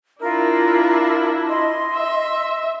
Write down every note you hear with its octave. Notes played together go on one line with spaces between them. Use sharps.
D4 E4 F4 A#4
D#5 C6
E5